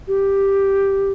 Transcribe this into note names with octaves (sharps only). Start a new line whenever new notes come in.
G4